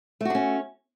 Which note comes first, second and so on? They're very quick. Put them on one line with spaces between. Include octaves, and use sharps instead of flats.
A3 F#4 D4 C#4